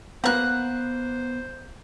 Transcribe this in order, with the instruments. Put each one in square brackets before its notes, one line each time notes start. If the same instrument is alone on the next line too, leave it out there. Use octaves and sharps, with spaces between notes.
[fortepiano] A#3 B4 A#5 [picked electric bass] B3 [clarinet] C5 [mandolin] F#5 F#6